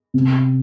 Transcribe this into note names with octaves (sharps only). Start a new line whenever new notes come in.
C3